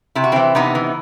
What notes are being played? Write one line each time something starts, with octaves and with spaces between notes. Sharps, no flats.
C3 E4
F#4
E3 C4 E4
C3 B3 D#4
E3